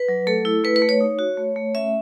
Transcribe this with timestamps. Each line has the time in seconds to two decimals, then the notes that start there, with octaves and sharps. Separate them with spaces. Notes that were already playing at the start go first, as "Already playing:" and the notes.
Already playing: B4
0.09 F#3
0.27 A3 A4
0.45 E4
0.64 A3 B4
0.76 B4
0.82 A3
0.89 C#5
1.01 D#4
1.19 F#4
1.37 A3
1.56 A3
1.75 C#4 E5